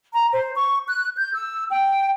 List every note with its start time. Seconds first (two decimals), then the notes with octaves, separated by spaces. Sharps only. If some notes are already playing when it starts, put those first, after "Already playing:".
0.14 A#5
0.32 C5
0.56 C#6
0.87 F#6
1.17 G6
1.33 E6
1.70 G5